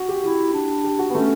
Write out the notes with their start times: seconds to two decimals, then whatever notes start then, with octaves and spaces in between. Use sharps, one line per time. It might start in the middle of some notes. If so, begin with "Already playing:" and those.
Already playing: F#4
0.09 G4
0.23 E4 G4
0.53 D4
0.84 G4
0.99 F#4
1.10 B3
1.14 A3 C#4